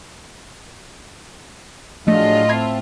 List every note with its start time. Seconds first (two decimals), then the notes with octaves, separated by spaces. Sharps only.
2.07 A2 F3 F#3 G#3 A3 D4 F4 D#5
2.49 C4 E5 A5 B5 G#6 C7